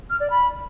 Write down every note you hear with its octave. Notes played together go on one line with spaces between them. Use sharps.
F6
D5
B5